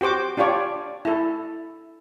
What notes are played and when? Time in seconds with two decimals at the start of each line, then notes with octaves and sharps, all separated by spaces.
0.01 F#4 G4 C5 D6
0.37 D4 F4 G4 C#5 D5
1.05 E4 A4